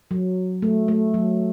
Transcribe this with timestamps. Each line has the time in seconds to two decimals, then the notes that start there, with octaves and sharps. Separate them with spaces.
0.11 F#3
0.62 A3
0.88 A3
1.14 F#3